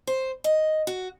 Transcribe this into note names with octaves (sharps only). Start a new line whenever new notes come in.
C5
D#5
F#4